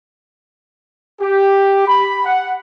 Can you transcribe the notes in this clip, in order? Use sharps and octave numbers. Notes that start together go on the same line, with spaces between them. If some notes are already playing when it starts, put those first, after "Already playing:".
G4
B5
F#5